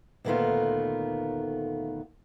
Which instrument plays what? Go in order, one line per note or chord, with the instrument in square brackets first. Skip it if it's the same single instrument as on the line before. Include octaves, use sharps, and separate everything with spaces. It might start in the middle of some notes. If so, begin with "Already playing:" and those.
[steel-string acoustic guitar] D2 A#2 D#3 A3 B3 F4